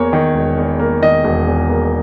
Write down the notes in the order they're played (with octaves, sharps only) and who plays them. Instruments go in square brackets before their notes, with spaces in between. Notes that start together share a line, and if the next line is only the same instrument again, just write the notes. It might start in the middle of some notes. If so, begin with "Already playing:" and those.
Already playing: [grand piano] E2 A#3 C#5
D#3
E1
E2
A#3
D#3 D#5
E1
E2
A#3